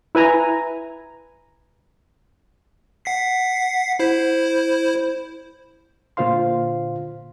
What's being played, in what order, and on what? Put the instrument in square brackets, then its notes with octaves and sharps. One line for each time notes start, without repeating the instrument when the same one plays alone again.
[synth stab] E4 B4 G#5 A#5
[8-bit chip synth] F#5 B6 C7
E4 C5
[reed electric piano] A#2 D3 F4 C5 F5 C6